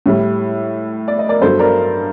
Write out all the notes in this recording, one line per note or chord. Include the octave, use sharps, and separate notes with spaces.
A2 G3
D5
D#5
A#4 D5
G2 F#3 A4 C5
A#4 D5